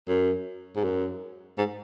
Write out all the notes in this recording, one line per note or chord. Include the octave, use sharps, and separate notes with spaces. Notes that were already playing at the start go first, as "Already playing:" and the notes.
F#2
G#2
F#2
G#2